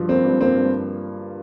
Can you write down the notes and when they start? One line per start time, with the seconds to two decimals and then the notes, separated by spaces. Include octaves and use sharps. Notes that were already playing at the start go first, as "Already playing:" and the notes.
Already playing: G2 F3
0.09 A#3 C4
0.25 G2
0.41 A#3 C4
0.56 G2